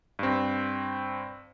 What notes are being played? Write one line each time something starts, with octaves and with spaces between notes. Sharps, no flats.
G2 C4